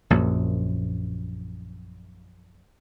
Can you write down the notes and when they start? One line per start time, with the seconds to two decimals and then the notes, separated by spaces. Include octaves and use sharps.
0.10 A#1 F#2 A#2 F#3